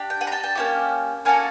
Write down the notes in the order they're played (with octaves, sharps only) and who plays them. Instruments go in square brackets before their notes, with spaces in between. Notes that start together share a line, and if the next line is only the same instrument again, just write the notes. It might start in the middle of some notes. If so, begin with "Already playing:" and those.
Already playing: [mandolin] D4 G4
G5
F#5 G#5
A#5
G5 A5
G5 A5
A#3 C#4 E4 G4
A#3 C#4 F#4 A4 G#5 A#5